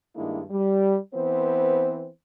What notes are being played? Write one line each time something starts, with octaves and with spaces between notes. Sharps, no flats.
G2 D#3 G#3 A#3 D4 E4
G3
E3 B3 C4 C5